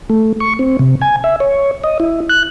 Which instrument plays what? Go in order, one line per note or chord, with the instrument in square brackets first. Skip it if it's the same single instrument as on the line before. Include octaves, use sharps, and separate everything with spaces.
[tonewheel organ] A3
C#6
C4
C3
G#5
E5
C#5
D#5
E4
F#6